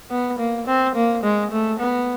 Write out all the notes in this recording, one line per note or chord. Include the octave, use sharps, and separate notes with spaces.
B3
A#3
C4
A#3
G#3
A3
B3